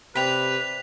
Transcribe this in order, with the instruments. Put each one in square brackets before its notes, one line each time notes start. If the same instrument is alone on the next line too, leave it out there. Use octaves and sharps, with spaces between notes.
[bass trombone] C3 [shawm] B4 [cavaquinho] D5 G5 B5 [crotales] B6 F7